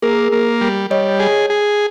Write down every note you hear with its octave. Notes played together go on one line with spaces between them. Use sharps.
A#3 G#4 A#4
A#3
G3
G3 C#5 D#5
G#4
G#4